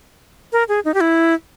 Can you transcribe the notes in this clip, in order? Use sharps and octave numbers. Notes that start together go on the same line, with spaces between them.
A#4
G#4
D#4
G4
E4